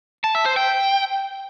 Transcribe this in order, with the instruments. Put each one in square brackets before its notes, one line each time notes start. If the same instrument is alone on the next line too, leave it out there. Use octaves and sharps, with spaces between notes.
[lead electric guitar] A5
E5
C5
G5